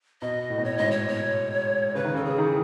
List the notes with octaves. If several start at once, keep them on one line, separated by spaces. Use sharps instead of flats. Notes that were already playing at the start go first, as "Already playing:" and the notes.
B2 D#5
A2
B2
A2 C#5
G#2 D#5
C#5
B2 C#5
C#3 B4
D#3
C#3 A4
G#4
D#3
E3